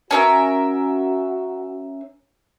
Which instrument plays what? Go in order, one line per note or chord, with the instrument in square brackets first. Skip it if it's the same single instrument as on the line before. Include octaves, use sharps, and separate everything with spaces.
[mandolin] C#4 A#4 E5 [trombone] F#4